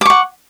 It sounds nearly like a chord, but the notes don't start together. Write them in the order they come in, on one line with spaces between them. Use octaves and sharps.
D6 C#6 F#5